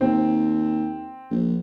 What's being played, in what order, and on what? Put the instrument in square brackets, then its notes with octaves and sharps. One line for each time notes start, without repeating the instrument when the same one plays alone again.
[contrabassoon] D#2 [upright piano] C4
[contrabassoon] A#1